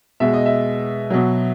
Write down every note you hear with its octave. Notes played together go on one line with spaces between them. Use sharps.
B2 G#3 E5
D#5
E5
B2 F#3